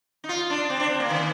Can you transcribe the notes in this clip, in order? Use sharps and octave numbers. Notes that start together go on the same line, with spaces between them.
D#4
F4
D4
C4
D4
C4
A#3
D#3